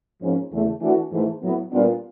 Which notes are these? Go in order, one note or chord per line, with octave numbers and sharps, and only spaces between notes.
G#2 F3 A#3 C#4
E2 C#3 E3 A3
E3 A3 D4 F#4 A4
G#2 E3 A3
A2 F#3 B3
A#2 G3 B3 D4 F4